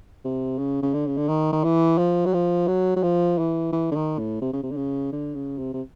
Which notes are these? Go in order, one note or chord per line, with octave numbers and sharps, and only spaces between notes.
C3
C#3
C#3
D3
C#3
D3
D#3
D#3
E3
F3
F#3
F3
F#3
F#3
F3
E3
E3
D3
D#3
A2
C3
C#3
C3
D3
C#3
D3
C#3
C3
C3